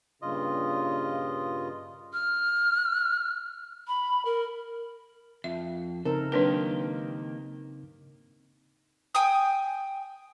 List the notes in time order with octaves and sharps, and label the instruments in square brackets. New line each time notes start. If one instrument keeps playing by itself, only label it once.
[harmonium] G2 A#2 C#3 [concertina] F4 D#5
[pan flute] F6
B5
A#4
[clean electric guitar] F2 [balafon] E5
[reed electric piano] C#3 C4 D#4 [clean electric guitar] A4 [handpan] A#4
[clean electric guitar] D#3 A#3 G4 [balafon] F#3 D4 B4
[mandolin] G5 G#5 D#6